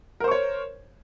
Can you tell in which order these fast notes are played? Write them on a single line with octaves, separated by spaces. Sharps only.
A#4 C5 C#6 C#5